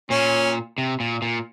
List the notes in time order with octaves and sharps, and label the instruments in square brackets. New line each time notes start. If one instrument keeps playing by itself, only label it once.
[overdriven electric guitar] A#2 [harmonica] C#4
[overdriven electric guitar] C3
A#2
A#2